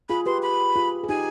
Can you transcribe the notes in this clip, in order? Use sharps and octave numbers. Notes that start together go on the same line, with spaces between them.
F4 G#4 B5
G4 B4 C6
B5
F4 G#4
G#4
D#4 G4 G#5